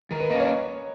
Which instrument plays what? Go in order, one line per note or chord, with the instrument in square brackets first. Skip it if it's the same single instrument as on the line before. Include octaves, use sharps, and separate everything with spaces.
[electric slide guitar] D#3 [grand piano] A#4
[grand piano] B4
[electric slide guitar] A#3 C#4 [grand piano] D#5
[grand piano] C#5